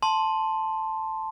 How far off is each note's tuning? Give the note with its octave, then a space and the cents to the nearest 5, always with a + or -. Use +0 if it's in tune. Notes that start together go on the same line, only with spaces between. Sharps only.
A5 +0 C6 +5